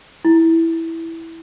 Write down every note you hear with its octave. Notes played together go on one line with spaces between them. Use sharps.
E4